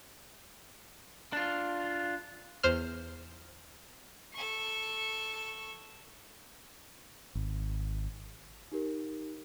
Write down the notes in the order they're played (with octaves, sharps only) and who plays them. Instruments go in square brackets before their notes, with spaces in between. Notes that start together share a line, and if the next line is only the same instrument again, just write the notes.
[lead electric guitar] D4 F4
[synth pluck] E2 C5 F6
[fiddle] A4 C#6
[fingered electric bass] G#1
[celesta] D#4 G4 A#4